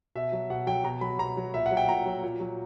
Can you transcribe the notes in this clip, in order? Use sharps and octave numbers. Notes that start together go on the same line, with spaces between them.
B2 E5
F#3
B2 F#5
F#3 G5
B2 A#5
F#3 B5
B2 A#5
F#3
A#2 E5
F#5
F#3
G5
A#2 A#5
F#3
A#2
F#3